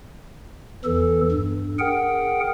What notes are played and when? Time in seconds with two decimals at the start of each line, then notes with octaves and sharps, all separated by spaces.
0.85 E2 E3 A4
1.31 G2
1.79 G#4 A#4 F#5 G5